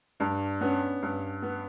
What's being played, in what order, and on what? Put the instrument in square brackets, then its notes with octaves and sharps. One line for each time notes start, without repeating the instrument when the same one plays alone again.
[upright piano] G2 [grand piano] D4
[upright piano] B3 [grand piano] C#4
[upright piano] G2
B3